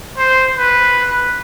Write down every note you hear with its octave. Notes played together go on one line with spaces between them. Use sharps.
C5
B4